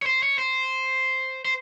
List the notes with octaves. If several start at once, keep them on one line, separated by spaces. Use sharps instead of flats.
C#5
C5
C#5
C5
C5